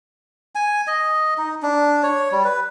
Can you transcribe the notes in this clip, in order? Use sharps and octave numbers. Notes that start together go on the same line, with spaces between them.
G#5
D#5
D#4
D4
C#5
G3
B4